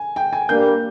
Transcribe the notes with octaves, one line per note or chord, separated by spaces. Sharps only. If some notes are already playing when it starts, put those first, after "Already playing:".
Already playing: G#5
G5
G#5
G2 G3 A#3 G6